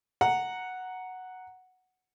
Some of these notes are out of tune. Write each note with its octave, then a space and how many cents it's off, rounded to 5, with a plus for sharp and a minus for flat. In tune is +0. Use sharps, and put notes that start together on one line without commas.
F#5 +0 A#5 +0